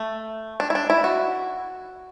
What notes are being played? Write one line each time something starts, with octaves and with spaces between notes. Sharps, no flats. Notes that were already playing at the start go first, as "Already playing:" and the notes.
Already playing: A3
D4
E4
D4
E4
F#4